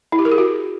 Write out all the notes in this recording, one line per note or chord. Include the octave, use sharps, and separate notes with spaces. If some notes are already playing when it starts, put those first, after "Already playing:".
E4
G4
A#4
G#4
F#4